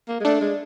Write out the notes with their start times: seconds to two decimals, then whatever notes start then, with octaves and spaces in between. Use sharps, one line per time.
0.09 A#3
0.20 G#3
0.25 A3 D4
0.41 G#3